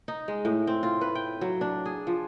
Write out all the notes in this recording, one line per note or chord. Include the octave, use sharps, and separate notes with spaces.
D#4
G#3
A2
C4
F4
B4
G5
F#3
D4
G#4
F3